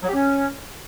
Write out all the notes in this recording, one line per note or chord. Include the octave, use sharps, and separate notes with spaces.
F#3
G4
C#4